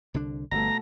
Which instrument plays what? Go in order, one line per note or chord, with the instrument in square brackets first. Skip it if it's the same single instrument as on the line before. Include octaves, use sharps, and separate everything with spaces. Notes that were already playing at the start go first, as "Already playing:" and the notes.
[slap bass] C2 D3 D4
[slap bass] G1 [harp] B2 A3 A4 [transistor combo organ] A#5